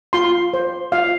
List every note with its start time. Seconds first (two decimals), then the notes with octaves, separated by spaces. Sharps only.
0.13 F4 C6
0.54 C5
0.92 F4 F5